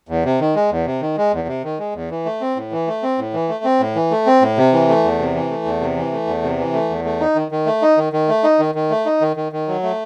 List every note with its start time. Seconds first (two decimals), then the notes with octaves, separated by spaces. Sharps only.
0.09 E2
0.25 C3
0.40 D#3
0.55 G#3
0.71 E2
0.86 C3
1.01 D#3
1.17 G#3
1.33 E2
1.48 C3
1.64 D#3
1.79 G#3
1.95 E2
2.10 E3
2.25 A3
2.41 C4
2.57 A2
2.72 E3
2.87 A3
3.03 C4
3.18 A2
3.33 E3
3.49 A3
3.64 C4
3.80 A2
3.95 E3
4.11 A3
4.26 C4
4.41 A2
4.58 C3
4.73 E3
4.89 A3
5.04 E2
5.19 C3
5.35 E3
5.50 A3
5.65 E2
5.81 C3
5.96 E3
6.12 A3
6.27 E2
6.43 C3
6.58 E3
6.73 A3
6.89 E2
7.04 A3
7.20 D#4
7.35 D#3
7.51 D#3
7.66 A3
7.82 D#4
7.97 D#3
8.13 D#3
8.28 A3
8.44 D#4
8.59 D#3
8.75 D#3
8.90 A3
9.06 D#4
9.21 D#3
9.36 D#3
9.52 D#3
9.68 F#3
9.83 A3